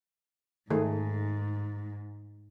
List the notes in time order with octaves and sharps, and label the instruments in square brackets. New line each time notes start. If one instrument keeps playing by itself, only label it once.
[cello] G#2 [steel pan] D#3 A3 G#4